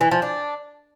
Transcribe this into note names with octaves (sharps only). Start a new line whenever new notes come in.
E3
F3
D4